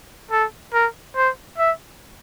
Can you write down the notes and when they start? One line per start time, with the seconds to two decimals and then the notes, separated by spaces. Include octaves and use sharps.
0.31 A4
0.73 A#4
1.16 C5
1.58 E5